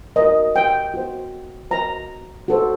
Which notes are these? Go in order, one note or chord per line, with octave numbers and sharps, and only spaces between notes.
F#4 A#4 D#5
G5
F#4 C5
F#4 C5 A#5
F#4 A4 C5